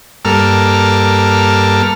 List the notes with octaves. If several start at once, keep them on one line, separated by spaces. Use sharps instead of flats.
G2 A#3 A4 F6